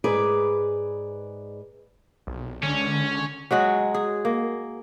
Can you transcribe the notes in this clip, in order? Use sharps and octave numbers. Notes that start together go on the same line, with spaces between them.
G#2 G#4 B4 D5
B1
C#2 D3 C#4 D4
F#3 G#3 F#4 G#4
G#4
A#3